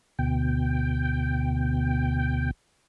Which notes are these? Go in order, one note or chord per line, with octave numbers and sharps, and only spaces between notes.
D2 B2 G5